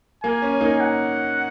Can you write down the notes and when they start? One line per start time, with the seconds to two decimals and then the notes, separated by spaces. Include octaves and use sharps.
0.24 A#3 G#5
0.42 C#4
0.61 A#3 D#4
0.81 F#5